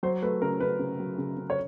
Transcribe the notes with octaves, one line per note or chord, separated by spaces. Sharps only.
F#3 C5
A3 B4
C#3 A#4
C#3 B4
C#3
F#3
C#3
C#3
C#5